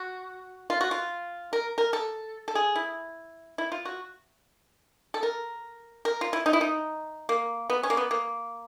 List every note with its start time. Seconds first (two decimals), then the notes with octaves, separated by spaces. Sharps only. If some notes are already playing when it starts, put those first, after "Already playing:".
Already playing: F#4
0.70 F4
0.81 F#4
0.91 F4
1.53 A#4
1.78 A#4
1.93 A4
2.48 A4
2.55 G#4
2.76 E4
3.58 E4
3.72 F4
3.85 F#4
5.14 A4
5.23 A#4
6.05 A#4
6.21 F4
6.33 E4
6.46 D#4
6.53 E4
6.61 D#4
7.29 A#3
7.70 B3
7.83 C#4
7.90 A#3
7.97 B3
8.11 A#3